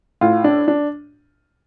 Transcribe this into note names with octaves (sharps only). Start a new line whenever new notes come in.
A2 F4
D4
D4